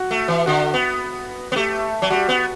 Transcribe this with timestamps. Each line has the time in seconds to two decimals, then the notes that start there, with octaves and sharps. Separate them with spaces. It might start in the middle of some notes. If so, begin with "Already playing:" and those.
Already playing: F#4
0.11 A3
0.28 E3
0.46 D3 F#4
0.74 B3
1.52 B3
1.56 A3 G4
2.02 F#3
2.10 G3 F#4
2.29 B3